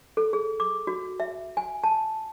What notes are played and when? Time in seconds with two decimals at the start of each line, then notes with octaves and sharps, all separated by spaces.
0.17 A4
0.33 G#4
0.60 D6
0.87 F#4
1.20 E5
1.57 G#5
1.84 A5